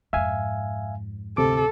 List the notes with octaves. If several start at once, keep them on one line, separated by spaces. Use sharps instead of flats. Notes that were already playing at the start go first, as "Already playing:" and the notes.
F2 G#2 E5 F5 G#5
D2 C3 A4 D6